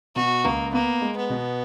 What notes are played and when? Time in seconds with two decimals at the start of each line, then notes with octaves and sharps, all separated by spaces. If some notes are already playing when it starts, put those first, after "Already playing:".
0.16 B2 F#4
0.44 C#2 A#3
0.73 A#3 B3
1.01 G#3
1.16 B3
1.30 B2